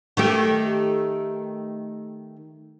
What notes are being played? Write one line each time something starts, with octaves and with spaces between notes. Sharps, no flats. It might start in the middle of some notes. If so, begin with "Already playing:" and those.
D#3 A3 G4